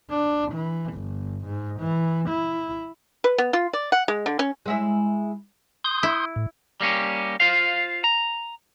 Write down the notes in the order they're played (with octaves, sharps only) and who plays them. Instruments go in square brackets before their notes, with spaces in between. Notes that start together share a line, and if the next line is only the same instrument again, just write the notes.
[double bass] D4
E3
G1
G#2
E3
E4
[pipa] B4
B3
F4
D5
F#5
G#3
D3
C#4
[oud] G#3 E4 E5
[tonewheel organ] C6 D#6 G6
[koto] E4
[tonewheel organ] A2
[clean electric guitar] G3 A#3 C#4 G4
F4 C5 F5
A#5